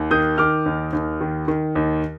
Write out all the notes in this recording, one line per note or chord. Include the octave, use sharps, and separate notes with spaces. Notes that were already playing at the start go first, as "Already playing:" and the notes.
Already playing: D#2
D#3 D#6 G6
D#3 D6 F6
D#2
D#2
D#3
D#3
D#2